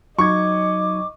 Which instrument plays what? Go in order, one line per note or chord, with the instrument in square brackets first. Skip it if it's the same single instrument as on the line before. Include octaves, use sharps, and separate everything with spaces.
[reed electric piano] F#3 D#4 G#6 [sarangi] D#5 [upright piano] C#6 [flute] D6